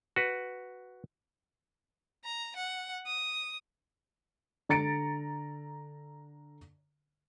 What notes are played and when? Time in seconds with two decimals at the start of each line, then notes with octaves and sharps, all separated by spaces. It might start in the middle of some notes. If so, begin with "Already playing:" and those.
0.16 F#4 B4
2.24 A#5
2.56 F#5
3.06 D#6
4.69 D3 A#5 A6 C#7 D7